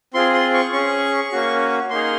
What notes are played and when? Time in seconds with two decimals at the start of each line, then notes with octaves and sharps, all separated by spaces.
0.14 C4 F4 G#4 C6
0.33 C6
0.54 C#6
0.73 C#4 G#4 C#6
1.32 A#3 C#4 F#4
1.90 A#3 D#4 G#4 C6